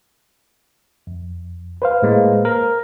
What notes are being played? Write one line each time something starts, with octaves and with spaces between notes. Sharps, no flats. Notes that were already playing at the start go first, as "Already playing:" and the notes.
F2
B4 C5 F5
A2 G#3 A#3
A#4